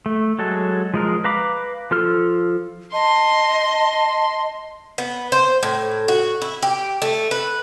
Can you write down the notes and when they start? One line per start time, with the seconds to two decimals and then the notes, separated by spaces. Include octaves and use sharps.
0.06 A3
0.39 F#3 G#3 A4
0.94 F3 G#3 A#4
1.24 B4 F5 A#5 B5 D6
1.91 F3 F4 A4 F6
2.93 D#5 A5 C6
4.98 B3
5.32 C5
5.63 A2
6.08 F#4
6.42 E4
6.62 G4
7.02 A3
7.31 B4